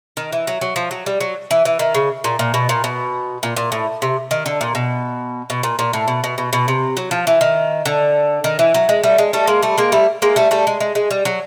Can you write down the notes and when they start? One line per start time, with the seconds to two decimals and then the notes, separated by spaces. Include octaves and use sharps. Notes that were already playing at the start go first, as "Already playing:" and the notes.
0.17 D#3
0.32 E3
0.47 F#3
0.61 F#3
0.76 F3
0.91 F#3
1.06 G3
1.20 F#3
1.51 E3
1.65 E3
1.79 D#3
1.95 C#3
2.24 A#2
2.39 A#2
2.54 B2
2.69 A#2
2.84 B2
3.43 A#2
3.57 A#2
3.72 A2
4.02 C3
4.31 D#3
4.46 D3
4.61 A#2
4.75 B2
5.50 B2
5.63 A#2
5.79 A#2
5.93 A2
6.08 B2
6.24 B2
6.38 B2
6.53 B2
6.68 C3
6.97 F#3
7.11 F3
7.27 E3
7.41 D#3
7.85 D3
8.44 D#3
8.59 E3
8.74 F#3
8.89 G#3
9.03 G3 A3
9.18 G#3
9.33 G3 A3
9.47 G#3 A#3
9.62 G3 A3
9.78 G#3 A#3
9.92 G3 A3
10.22 G#3 A#3
10.36 G3 A3
10.51 G3 A3
10.67 G#3
10.80 G#3
10.95 G#3
11.11 G3
11.25 F#3